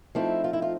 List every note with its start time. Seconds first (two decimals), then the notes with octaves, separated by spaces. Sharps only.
0.15 F3 A3 C4 D#4 E4
0.44 F4
0.53 E4
0.62 F4